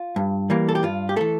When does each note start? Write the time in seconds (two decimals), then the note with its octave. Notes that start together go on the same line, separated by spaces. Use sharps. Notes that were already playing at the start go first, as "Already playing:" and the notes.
Already playing: F4
0.16 G2
0.50 E3 G3 A#3
0.69 A4
0.75 G4
0.83 G2 F4
1.09 G4
1.16 E3 A3 A4